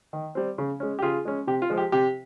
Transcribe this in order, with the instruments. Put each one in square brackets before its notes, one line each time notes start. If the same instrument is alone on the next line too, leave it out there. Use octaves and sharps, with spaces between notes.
[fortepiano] D#3
G3 C4
C#3
G#3 C#4
G4
C#3 F4 G#4
G#3 C#4
C3 G4
F4
F3 G#3
G4
C3 G4